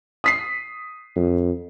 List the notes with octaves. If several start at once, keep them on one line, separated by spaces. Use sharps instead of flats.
D#6 B6 C7
F2